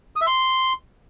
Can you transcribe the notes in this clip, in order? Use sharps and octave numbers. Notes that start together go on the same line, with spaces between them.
D#6
E5
C6